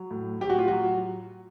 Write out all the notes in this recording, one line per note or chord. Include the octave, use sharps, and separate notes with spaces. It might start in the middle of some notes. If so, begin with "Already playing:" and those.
Already playing: F#3
A2
A2 G4
F#4
F4
F#3 F#4